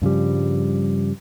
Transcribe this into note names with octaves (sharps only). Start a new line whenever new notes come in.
G2 C#3 F3 G3